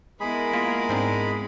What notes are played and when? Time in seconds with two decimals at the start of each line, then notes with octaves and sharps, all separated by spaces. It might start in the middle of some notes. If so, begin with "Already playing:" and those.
0.20 G#3 B3 E4 G#4 A#4 B5
0.53 A#3 F4
0.89 G#2 C4 D4